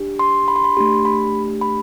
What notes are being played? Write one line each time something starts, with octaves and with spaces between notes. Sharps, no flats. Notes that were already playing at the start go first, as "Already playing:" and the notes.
Already playing: D4 G4
C6
B5
C6
B5
A3 D4 G4 C6
B5
B5